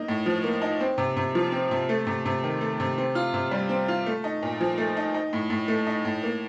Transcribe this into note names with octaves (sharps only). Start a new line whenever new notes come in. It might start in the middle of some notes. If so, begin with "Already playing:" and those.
Already playing: A#3 D#4
A2
F3
A#3
D#4
C4
C3
C3
F3
C4
C3
A3
C3
C3
D#3
A3
C3
C4
F4
C3
G3
C4
F4
A3
D#4
A#2
F3
A3
D#4
D#4
A2
A2
A3
D#4
A2
A#3